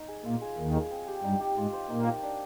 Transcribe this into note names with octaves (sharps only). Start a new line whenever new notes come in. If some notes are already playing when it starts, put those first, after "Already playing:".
Already playing: D#4
G#4
A#2 A#3 F4
G#4
D#2 D#3 F4
G#4
C4
G4
G2 G3 D#4
G4
G#2 G#3 F4
C5
A#2 A#3 D#4
A#4
D4